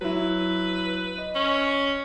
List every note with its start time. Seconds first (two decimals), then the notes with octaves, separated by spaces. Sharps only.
0.01 F#3 E4 B4
1.18 D#5
1.35 C#4